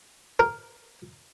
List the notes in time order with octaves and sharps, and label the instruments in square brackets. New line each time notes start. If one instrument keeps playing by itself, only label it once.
[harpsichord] A#4